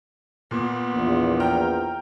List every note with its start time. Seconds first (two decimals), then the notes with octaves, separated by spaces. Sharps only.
0.51 A#2 B3
0.93 A#1 E2
1.40 G5 A#5 F6